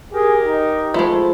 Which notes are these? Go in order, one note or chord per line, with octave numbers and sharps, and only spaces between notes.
G4 G#4 A#4
D#4
F3 G#3 A3 B5